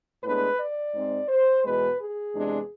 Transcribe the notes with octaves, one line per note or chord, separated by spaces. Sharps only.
A2 G#3 B3 D4 B4
D5
G#2 G#3 C4
C5
E2 B2 G#3 B3 B4
G#4
E2 C3 G#3 D4